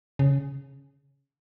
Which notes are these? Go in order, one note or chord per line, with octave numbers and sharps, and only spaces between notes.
C#3